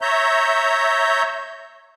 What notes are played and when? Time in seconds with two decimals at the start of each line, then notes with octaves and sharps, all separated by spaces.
0.02 C#5 E5 A#5 G6